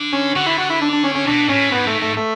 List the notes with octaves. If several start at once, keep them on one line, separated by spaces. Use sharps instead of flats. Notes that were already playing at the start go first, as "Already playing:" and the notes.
Already playing: D3
C#4
D3 F#4
E4
F#4
E4
D4
D4
C#4
C#4
B2 D4
A2 C#4
G#2 B3
A3
A3
A3